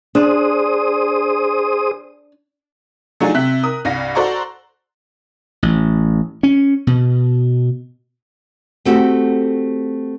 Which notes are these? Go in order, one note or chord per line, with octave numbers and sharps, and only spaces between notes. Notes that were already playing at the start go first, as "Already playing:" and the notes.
D4 G#4 C5 D#6
F#3 A3 D4 D#4 F4 G#4
C3 E5 F#6 B6
A#4 D#6
C2 G2 F5 A#6
F#4 A4 C5 D5 A#5 C#6
A1
C#4
B2
A3 C4 F#4 G4